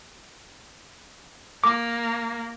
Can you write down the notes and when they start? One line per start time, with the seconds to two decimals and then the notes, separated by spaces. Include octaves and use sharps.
1.64 A#3 D6